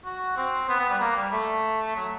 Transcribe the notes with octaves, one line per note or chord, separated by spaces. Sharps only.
F#4
C4
B3
B3
G3
A#3
G3
A3
F#3